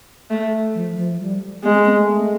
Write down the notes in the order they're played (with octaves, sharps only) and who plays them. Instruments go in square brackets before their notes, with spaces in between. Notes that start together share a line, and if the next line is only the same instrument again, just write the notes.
[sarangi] A3
[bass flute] F3
F3
G3
[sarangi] G#3 [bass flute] B3
[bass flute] C4
B3
A3